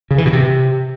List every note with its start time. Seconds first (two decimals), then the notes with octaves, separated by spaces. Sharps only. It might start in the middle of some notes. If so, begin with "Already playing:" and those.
0.11 C#3
0.18 E3
0.25 B2
0.33 C3